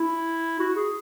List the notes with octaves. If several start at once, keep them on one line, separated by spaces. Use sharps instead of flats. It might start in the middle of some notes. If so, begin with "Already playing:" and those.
Already playing: E4
F#4
G#4